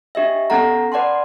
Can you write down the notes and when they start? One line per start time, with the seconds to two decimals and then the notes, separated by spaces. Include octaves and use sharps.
0.15 D4 G4 D#5 E5
0.50 B3 C#4 A4 F#5 A#5
0.92 B4 D5 F#5 A5 C6